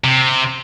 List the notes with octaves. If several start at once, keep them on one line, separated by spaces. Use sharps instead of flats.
C3